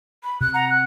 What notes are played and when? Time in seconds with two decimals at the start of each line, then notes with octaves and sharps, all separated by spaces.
0.23 B5
0.41 C3 F#6
0.54 F#5 A#5
0.70 F#6